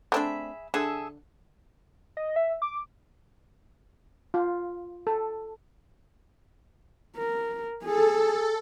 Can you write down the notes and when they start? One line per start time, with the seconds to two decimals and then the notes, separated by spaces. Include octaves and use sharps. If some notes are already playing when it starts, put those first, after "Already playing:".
0.12 A3 C4 D4 G#4 E5 B5
0.74 D3 G#4 A4 E5
2.17 D#5
2.36 E5
2.62 D6
4.34 F4
5.07 A4
7.17 A#4
7.85 G#4 A4